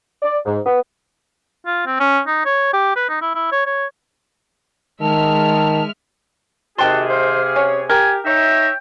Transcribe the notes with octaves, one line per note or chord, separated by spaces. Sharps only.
D5
G#2
B3
F4
C4
C#4
D#4
C#5
G4
B4
D#4
E4
E4
C#5
C#5
D#3 G#3 E5 A5 F6
C3 D#3 F#4 G#4 G5 A5 C6
C5 F5
C#4 C#5
G4 A#4 G#5
D#4 C#5 E5 G5